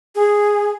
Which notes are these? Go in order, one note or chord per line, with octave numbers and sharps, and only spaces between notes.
G#4